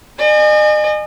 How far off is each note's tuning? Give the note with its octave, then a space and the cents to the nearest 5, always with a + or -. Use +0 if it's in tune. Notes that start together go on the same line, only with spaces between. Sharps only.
D#5 -40 G#5 +0